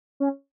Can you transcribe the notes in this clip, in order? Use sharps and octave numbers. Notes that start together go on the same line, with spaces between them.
C#4